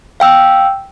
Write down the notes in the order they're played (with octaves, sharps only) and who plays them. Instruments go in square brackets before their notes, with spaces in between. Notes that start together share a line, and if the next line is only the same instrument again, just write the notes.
[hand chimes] F5 G5 E6